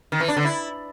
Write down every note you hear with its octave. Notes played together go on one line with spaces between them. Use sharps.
D#3
E3
D4
D3
E4